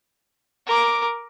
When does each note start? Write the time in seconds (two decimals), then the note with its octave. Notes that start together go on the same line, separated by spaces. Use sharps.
0.66 A#4 D6